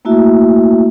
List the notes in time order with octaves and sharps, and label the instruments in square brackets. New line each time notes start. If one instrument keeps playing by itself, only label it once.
[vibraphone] A3 A#3 E4 F#4 E5